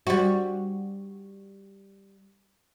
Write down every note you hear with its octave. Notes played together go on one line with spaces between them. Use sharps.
G3 F#4